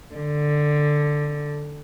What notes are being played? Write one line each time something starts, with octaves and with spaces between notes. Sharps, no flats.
D3